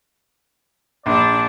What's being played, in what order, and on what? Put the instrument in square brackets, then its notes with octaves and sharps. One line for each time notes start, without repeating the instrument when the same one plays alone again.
[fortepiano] A#1 [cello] D4 [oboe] D5